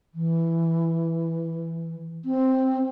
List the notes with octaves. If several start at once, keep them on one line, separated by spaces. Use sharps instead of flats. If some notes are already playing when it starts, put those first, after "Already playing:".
E3
C4